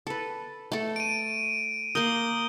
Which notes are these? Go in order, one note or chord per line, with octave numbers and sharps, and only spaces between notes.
A4 B4
A3 A4
D7 D#7
A#3 A#4 D#6 G6 G7